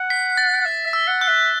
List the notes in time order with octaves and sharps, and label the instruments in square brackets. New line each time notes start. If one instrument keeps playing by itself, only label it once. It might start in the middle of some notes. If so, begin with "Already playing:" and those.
Already playing: [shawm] F#5
[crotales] B6
A6
[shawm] F#5
E5
E5
[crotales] E6
[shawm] F#5
[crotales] F#6
[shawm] E5